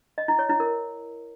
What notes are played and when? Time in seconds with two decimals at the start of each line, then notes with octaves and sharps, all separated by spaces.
0.18 D#5
0.28 E4
0.39 C#5
0.49 E4
0.60 A#4